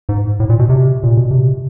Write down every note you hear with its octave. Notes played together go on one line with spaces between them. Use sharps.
G#2
A2
A#2
B2
C3
A#2
B2
C3